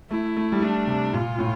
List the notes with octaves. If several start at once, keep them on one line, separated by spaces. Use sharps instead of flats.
A3 E4
A3
G3
A3 D4
C3
A#2 F4
A2